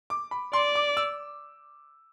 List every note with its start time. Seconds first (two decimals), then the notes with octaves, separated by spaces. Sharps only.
0.10 D6
0.31 B5
0.53 D5 C6
0.75 D6
0.97 E6